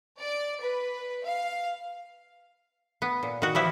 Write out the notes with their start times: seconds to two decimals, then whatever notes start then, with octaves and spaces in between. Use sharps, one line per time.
0.20 D5
0.61 B4
1.25 F5
3.02 B3
3.23 A#2
3.42 D#3 F#4
3.55 E3 F3 E4 G4